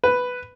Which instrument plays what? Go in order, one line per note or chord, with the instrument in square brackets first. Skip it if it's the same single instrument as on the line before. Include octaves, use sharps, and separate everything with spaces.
[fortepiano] B4